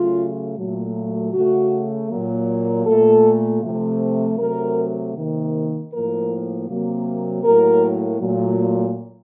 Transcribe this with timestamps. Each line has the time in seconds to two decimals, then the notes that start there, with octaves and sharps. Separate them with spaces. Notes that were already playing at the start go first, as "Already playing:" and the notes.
Already playing: C#3 F#3 A3 F4
0.57 A#2 F#3 A3
1.33 C#3 A3 F#4
2.10 A#2 F#3 A#3
2.86 A#2 A3 A4
3.62 C3 F3 A3
4.39 C3 F#3 A3 A#4
5.15 C3 D#3 A#3
5.91 A2 F3 A#3 A#4
6.68 C3 F#3 A#3
7.44 A2 F#3 A#3 A#4
8.20 A#2 F#3 A3